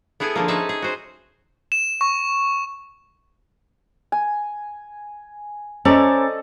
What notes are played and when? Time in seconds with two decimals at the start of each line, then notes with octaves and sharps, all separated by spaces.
0.20 B3 E4 G#4 A4 G#5
0.35 D3 F3 A#3
0.48 C#4 D#4 G#4 B4 E5 A5
0.69 G#4
0.82 F#4 C5
1.72 E7
2.01 C#6
4.12 G#5
5.85 C#4 A4 C5 D5 D#5 A#5 D6